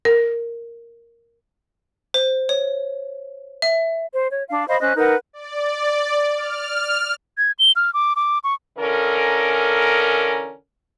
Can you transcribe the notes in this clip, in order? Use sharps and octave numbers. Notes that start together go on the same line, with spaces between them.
A#4
C5
C#5
E5
C5
C#5
D4 F5
C5 D#5 F5 B5
C#4 C5 D#5 F#6
D#4 A#4 B4 F#5
D5
F6
G#6
G7
F6
D6
D6
C#6
D3 E3 C#4 A4 A#4